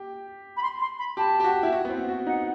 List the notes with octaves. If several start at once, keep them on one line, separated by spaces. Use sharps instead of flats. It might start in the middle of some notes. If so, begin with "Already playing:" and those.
Already playing: G4
B5
C6
C6
B5
G4 A5
G4
F#4
E4
F#4
B3
C4
F#4
D#4 F#5